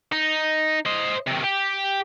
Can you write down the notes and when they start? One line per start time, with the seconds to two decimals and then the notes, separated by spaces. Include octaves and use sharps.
0.13 D#4
0.86 C5 D#5
1.27 C3 D#3
1.44 G4